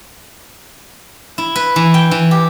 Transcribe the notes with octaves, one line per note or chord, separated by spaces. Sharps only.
E4
B4
E3
G5
E3
G4